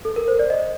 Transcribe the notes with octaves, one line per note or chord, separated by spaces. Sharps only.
A4
A#4
C5
D5
D#5